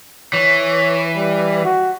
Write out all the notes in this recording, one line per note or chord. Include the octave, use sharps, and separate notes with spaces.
E3 C#5
G3
F#4